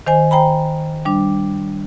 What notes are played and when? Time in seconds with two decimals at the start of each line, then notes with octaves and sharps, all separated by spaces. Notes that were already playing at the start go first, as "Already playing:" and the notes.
0.07 D#3 C5 G#5
0.31 C5 G5 A#5 B5
1.05 G3 D4